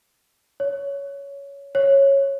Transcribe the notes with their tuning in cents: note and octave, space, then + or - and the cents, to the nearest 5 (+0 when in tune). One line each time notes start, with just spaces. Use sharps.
C#5 +15
C#5 -10